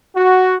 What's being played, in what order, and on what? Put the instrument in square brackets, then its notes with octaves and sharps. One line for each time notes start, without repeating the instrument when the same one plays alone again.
[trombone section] F#4